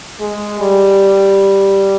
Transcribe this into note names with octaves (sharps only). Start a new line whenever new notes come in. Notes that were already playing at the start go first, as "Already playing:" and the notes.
G#3
G3